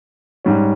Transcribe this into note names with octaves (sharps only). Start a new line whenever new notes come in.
G#2 G3 C#4